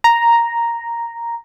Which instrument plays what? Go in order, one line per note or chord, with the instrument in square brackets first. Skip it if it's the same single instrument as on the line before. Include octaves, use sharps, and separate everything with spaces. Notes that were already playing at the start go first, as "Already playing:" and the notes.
[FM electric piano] A#5